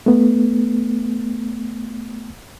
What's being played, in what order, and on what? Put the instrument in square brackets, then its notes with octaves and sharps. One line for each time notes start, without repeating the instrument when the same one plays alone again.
[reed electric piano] A3 B3